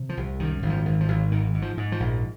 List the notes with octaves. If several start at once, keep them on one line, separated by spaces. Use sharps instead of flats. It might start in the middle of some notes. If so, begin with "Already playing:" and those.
Already playing: C3
F3
C2
F#2 D#3
G#1
F3
G#1
F3
G#1
G#2 D#3
G#2
F3
G#2
F3
A#1